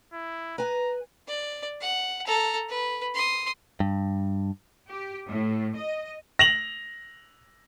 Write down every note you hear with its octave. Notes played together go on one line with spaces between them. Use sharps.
E4
B4 G#5 A#5
D5
F#5
A4 A#5
B4
C6 D#6
G2
G4
A2
D#5
A#6 F7 F#7